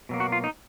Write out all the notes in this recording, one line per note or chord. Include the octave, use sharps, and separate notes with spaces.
B2 F#3 A#3
F#4
F4
D#4